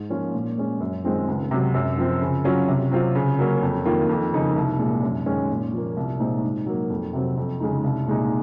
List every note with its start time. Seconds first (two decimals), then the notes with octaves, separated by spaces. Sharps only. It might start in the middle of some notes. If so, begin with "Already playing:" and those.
Already playing: G#2
0.10 F3 A#3 C#4 F4
0.34 A#2
0.58 G#3 C#4
0.81 F#2
1.04 D#3 G#3 C4 F4
1.28 C#2
1.51 C3 F#3
1.74 F#2
1.98 F3 C4
2.21 C#3
2.44 F#3 C#4 F4
2.68 C3
2.91 F#3 C4 F4
3.15 C#3
3.39 F#3 A#3 C#4
3.62 F2
3.85 D#3 A#3 F4
4.09 F2
4.33 C#3 F3 A#3 D#4
4.56 C2
4.79 A#2 G#3
5.03 F#2
5.26 D#3 G#3 C#4
5.49 A#2
5.73 F3 A#3
5.97 C2
6.20 A#2 G#3 C4 D#4
6.44 G#2
6.66 F#3 A#3
6.90 F2
7.13 C3 F#3 C4
7.37 F2
7.60 C#3 G#3 D#4
7.84 C2
8.08 A#2 G#3 D#4